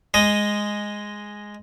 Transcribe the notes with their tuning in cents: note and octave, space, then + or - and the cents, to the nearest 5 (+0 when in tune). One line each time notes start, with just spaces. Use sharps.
G#3 +0 D#5 +0